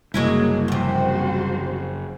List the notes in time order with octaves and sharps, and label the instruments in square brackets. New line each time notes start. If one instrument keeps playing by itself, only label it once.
[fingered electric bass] F#1 [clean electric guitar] C2 [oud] F#3 G#3 E4 [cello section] A#3
[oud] E2 C3 [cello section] F3 F#4 C5